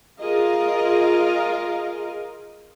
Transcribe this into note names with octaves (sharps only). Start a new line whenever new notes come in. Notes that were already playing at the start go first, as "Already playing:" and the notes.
F4 G#4 A#4 D#5 F5